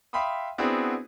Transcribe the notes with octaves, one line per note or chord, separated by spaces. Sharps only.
E5 F5 G5 B5 C6 D#6
B3 C4 D4 E4 F#4 G#4